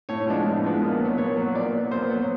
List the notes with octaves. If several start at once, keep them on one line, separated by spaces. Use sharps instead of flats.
A2 C#5
F3 G#3 B3 D4
A2
F3 G#3 B3 D4
A#2
F#3 B3
A#2 C#5
F#3 B3
A#2 D5
F#3 B3
A#2 C5
F#3 B3